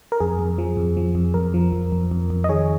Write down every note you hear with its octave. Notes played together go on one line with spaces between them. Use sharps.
A#4
F2 G#4
F2
F3
F2
F3
F2
F2 A#4
F3
F2
F2
F2
F2
D#5
D#3 G#4 C#5